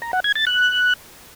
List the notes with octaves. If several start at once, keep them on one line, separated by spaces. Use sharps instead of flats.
A#5
F#5
G#6
A6
F#6